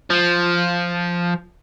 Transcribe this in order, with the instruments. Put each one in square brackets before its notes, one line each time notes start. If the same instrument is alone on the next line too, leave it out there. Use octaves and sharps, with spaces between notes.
[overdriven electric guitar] F3